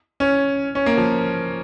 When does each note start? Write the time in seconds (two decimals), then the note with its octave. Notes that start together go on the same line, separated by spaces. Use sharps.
0.20 C#4
0.75 C#4
0.86 A#3
0.97 F3